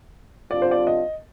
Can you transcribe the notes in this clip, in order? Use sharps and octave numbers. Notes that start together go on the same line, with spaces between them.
D3 G3 C4 F4 D5
C5
D5
D#5